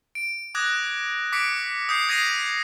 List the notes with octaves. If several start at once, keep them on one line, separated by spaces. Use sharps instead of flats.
D7
D6 D#6 F#6 G#6 A#6
D6 B6 C#7 D7
D#6 G6 C7
D#6 G#6 A#6 C7 D#7 F7